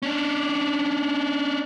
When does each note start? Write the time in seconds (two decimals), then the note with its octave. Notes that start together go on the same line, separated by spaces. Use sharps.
0.02 C#4 D4